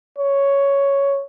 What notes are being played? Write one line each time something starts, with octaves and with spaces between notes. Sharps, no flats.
C#5